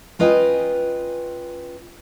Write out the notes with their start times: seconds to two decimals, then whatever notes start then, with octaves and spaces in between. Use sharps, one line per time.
0.19 C#4 F4 B4 D#5 G5 G#5